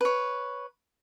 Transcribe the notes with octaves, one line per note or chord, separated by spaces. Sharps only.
B4 C#5